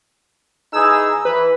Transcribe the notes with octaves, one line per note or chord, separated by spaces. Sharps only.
E3 D#4 G#4 E6
E3 B4